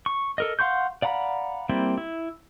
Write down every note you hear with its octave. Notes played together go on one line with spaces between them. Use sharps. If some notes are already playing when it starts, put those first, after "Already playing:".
C#6
A4 A#4 D#5
F5 F#5 C6 C#6 G6
D5 F5 F#5 A#5 B5
G3 A#3 C4 E4
E4